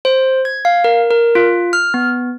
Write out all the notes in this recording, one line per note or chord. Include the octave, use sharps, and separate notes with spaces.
C5
G#6
F5
A#4
A#4
F4
F6
B3